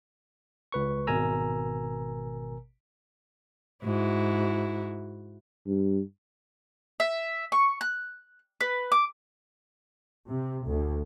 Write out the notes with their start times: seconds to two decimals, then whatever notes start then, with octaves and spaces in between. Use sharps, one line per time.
0.72 C#2 B4 C#6
1.07 G#1 B2 A#4 G#5 A#5 E6
3.83 G#2 E4 F#4
5.67 G2
7.00 E5
7.52 C#6
7.81 F#6
8.61 B4
8.92 D6
10.29 C3
10.66 D2